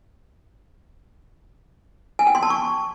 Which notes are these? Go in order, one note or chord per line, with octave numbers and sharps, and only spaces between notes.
G#5
G5
C6
A5
C#6